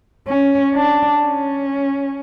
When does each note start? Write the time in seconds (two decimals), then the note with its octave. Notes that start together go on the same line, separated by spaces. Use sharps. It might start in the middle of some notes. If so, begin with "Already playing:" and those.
0.27 C#4
0.74 D4
1.21 C#4